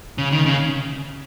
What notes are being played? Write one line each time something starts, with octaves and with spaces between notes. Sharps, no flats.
C#3
D#3
C#3